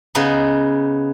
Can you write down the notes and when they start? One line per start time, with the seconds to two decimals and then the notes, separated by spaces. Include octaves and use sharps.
0.15 C#3 B3 D#4